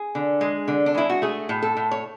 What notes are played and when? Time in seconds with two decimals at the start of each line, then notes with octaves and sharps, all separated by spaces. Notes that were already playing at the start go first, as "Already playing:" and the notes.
Already playing: G#4
0.15 D3
0.41 G#3
0.68 D3
0.86 D4
0.95 G#3 E4
1.10 F#4
1.22 A3 G#4
1.49 A2
1.62 A4
1.77 A2
1.91 C#5